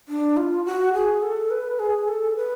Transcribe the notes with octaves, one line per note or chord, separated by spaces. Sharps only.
D4
F4
F#4
G#4
A4
B4
G#4
A4
B4